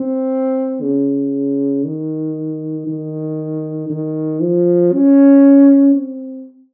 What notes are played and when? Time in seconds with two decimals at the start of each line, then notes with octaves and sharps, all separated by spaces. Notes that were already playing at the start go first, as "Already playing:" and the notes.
Already playing: C4
0.82 C#3
1.85 D#3
2.87 D#3
3.90 D#3
4.41 F3
4.93 C#4
5.94 C4